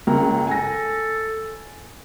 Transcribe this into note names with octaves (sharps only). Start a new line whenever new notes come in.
C#2 A#3 C#4 A#5
A4 G#5 A#6